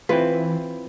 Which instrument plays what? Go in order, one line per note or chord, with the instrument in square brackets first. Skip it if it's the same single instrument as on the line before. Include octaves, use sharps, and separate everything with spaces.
[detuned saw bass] E3 [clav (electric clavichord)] C4 E4 F4 [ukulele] B4